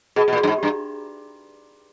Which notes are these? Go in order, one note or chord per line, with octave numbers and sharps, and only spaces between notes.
B2 G#4
B2
A#2
F#4
G2
G#2
G2 G4